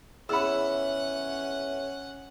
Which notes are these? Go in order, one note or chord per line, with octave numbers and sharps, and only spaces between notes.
E2 C#4 C#5 E5 F#5 B5 E6